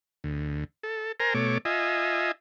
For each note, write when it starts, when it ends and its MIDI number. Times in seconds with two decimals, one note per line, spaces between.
0.24 0.64 38
0.83 1.12 69
1.20 1.34 70
1.20 1.34 72
1.20 1.34 80
1.20 1.34 82
1.34 1.58 47
1.34 1.58 57
1.34 1.58 73
1.34 1.58 86
1.65 2.32 65
1.65 2.32 75
1.65 2.32 76
1.65 2.32 80